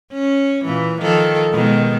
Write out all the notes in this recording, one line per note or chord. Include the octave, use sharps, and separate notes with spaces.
C#4
A#2 E3
D#3 F3 A4
B2 D#3 G#3